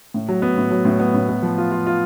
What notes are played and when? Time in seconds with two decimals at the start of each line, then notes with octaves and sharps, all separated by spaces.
0.14 A2
0.29 F#3
0.42 B3
0.57 A2
0.71 F#3
0.85 A2
1.00 B3
1.14 A2
1.29 B3
1.42 F3
1.58 F4
1.72 F4
1.86 F4